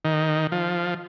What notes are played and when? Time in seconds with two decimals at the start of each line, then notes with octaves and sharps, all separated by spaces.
0.05 D#3
0.52 F3